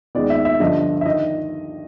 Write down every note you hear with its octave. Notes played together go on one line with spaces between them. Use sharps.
D#2 D#3 G#3 B3 D5
E5
E5
G2 D3 F3 D#5
E5
D#3 D#5